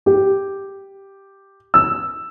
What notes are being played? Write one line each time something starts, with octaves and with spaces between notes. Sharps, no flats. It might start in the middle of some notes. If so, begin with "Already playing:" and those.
G4
E6